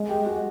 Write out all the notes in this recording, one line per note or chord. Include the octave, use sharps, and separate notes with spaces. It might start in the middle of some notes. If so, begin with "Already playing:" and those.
Already playing: G#3
G4 G5
F#4 F#5